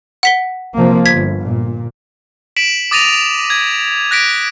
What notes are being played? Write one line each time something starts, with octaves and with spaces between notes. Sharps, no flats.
F#5 B6 G7
C3 F3 A#3
G1 G#6 B6
A#2
B6 D7 E7 F#7
D6 D#6 A6 A#6 D#7 F7
G#6
F#6 A#6 B6 D7